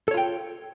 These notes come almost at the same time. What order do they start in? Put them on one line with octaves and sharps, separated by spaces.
A4 C#5 F4 G5